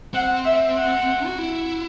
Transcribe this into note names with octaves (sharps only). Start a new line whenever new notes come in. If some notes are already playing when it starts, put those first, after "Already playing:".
C4 F#5
E5
F#5
F#4
E4